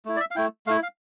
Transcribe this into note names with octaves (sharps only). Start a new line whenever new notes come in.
A3 E4
D5
E5
F5
A3 E4 G5
A3 E4 F5
F5